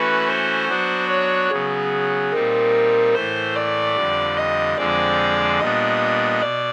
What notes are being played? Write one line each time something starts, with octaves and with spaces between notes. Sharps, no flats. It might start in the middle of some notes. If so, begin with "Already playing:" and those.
Already playing: E3 A3 C#4 F#4 B4
C5
F#3 B3 D4 F#4
C#5
C#3 F#3 B3 G#4
A#2 G3 C4 D#4 A#4
A2 E3 A3 C5
D5
F2 D3 G3
D#5
F2 D3 F3 G#3 C4 D5
A#2 G3 B3 D4 D#5
B2 D5